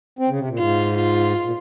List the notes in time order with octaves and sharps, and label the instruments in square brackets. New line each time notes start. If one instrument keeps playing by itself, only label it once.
[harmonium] C4
C#3
C3
A#2
[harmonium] G#2 [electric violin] F4
[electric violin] F4
[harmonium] A#2